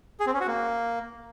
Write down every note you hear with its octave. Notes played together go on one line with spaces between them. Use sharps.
G#4
C4
C#4
F#4
A#3